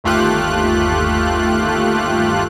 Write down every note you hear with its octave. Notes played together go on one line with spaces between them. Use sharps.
G1 D#2 A3 F4 G4 F#6